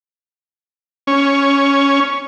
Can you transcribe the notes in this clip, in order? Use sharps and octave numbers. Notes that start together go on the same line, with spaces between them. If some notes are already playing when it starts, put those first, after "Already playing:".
C#4